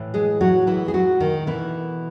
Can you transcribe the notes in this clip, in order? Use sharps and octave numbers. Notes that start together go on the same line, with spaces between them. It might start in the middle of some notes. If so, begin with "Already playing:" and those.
Already playing: A2 E3
G#3 G#4
F#3 F#4
A2 E3 G#3 E4
G#4
F#3 F#4
D#3 D#4
B2 E3 A3 E4